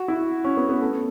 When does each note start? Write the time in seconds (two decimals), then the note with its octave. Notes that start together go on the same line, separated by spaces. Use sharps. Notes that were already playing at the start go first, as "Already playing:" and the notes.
Already playing: F#4
0.08 E4
0.44 C#4
0.57 B3
0.69 B3
0.81 A3